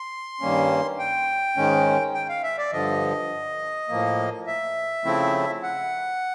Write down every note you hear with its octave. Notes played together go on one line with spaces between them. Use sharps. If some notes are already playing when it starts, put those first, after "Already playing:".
Already playing: C6
G2 D#3 G3 A#3 C#4
G5
G#2 D#3 G#3 C#4
G5
F5
E5
D5
G2 D3 F3 D#5
A2 F3 A#3
E5
C#3 F3 A3 C4 E4
F#5